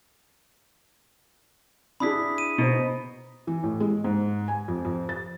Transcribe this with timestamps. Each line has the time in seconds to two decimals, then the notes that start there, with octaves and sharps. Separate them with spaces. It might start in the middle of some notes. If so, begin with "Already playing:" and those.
2.00 D4 E4 G#4 B5 D#6 B6
2.38 D#7
2.58 B2 D#4 C5
3.47 E3
3.64 A2
3.80 G#3
4.04 G#2
4.48 G#5
4.68 F2
4.85 F2
5.09 A6